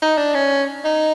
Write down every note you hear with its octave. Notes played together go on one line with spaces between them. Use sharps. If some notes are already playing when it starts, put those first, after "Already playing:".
D#4
D4
C#4
D#4